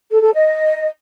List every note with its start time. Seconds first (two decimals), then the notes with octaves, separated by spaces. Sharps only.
0.10 A4
0.22 A4
0.34 D#5